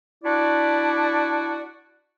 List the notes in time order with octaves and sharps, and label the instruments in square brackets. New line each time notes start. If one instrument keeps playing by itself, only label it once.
[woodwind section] D4 E4 F#4 D5